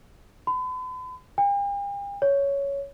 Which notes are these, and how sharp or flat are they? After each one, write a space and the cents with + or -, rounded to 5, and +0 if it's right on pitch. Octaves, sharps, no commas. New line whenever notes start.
B5 +45
G5 +45
C#5 +10